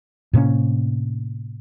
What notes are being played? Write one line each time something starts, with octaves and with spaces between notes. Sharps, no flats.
A2 C3 A#3 C#4